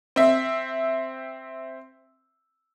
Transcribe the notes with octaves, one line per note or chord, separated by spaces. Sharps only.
C4 E5